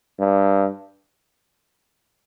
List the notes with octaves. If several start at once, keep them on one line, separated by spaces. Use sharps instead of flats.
G2